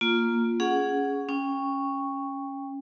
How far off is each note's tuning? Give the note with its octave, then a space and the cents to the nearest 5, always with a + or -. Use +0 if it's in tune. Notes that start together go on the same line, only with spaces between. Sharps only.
A#3 +0 F4 +0
C#4 +10 G#4 +0 F#5 +0
C#4 +0 G5 +25 C#6 +0